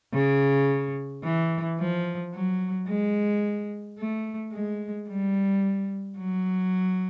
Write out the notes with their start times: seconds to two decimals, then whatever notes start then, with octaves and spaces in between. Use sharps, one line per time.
0.14 C#3
1.24 E3
1.79 F3
2.34 F#3
2.88 G#3
3.98 A3
4.53 G#3
5.09 G3
6.18 F#3